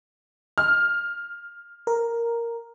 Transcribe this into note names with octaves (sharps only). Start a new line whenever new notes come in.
F6
A#4